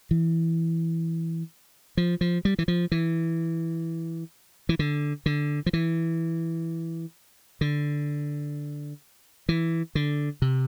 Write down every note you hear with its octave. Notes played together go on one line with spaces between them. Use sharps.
E3
F3
F3
G3
E3
F3
E3
E3
D3
D3
F3
E3
D3
E3
D3
C3